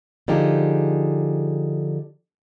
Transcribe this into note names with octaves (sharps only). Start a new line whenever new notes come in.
D3 F3 D#4 G4 G#4